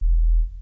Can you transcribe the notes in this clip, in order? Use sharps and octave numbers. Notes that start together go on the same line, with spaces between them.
E1